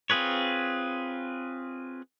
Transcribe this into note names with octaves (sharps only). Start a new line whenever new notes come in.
C4 F4 G#4 B4 C#5